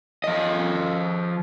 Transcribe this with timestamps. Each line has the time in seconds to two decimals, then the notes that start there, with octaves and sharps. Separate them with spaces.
0.24 F3 D#5